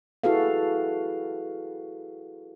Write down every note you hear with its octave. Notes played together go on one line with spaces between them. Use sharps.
E4 F#4 G#4 A4 B4 F5